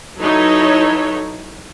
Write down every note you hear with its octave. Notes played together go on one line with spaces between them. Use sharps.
F#3 D#4 E4 A4 B4 C#5